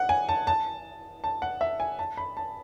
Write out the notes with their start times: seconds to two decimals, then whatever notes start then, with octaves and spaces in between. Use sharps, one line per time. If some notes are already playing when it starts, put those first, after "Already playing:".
Already playing: F#5
0.09 G#5
0.29 A5
0.47 A5
1.24 A5
1.42 F#5
1.61 E5
1.80 G#5
1.99 A5
2.17 B5
2.37 A5